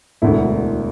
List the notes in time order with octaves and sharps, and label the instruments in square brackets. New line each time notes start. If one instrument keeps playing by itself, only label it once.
[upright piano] E1 D2 D3 E4